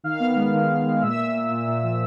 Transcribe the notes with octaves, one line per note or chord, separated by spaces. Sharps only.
D#3 F5 F6
B3
G#3
D#3
D#3
G#3
A#2 E5 E6
A#2
A#2
A#2
A#2
F3